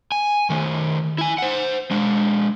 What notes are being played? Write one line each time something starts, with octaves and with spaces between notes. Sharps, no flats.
G#5
D#3 A3
E4 G#5
C5 F#5
G#3 D4